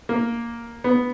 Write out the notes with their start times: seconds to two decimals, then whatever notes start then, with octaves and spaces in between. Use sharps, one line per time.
0.09 A#3
0.84 B3